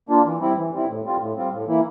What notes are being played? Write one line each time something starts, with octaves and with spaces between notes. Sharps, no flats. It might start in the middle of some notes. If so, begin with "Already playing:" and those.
A#3 D4 F4
E3
G3 C4 E4
E3
G3 C4 E4
A2
G3 C4 F4
A2
G3 C4 F4
A2
E3 A#3 E4